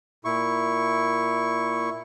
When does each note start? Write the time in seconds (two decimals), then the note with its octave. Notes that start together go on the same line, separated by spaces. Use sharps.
0.25 A#2 E4 C#6